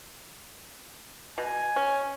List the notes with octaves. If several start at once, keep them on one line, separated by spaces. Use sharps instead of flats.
B2 G#5
C#4